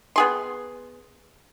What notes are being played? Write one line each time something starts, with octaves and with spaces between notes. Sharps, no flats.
B3 G#4 C6